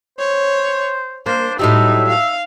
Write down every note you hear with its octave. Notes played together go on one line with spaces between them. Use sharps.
C5 C#5
A#3 D4 C5
A2 F#3 G3 D#4 E5
F5